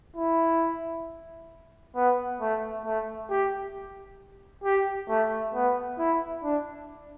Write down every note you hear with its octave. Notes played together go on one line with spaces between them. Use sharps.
E4
B3
A3
A3
G4
G4
A3
B3
E4
D4